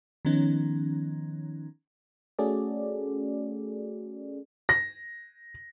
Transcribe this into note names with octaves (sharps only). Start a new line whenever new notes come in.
D#3 F3 B3 C#4 D#4
A3 C#4 F#4 G#4 A4 D5
A#6